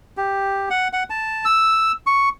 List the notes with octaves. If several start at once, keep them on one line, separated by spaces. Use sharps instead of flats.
G4
F#5
F#5
A5
E6
C#6